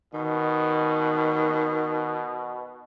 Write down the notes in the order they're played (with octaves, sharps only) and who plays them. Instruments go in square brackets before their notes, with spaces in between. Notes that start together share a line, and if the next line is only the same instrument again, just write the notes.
[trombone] B2 [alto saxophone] D#3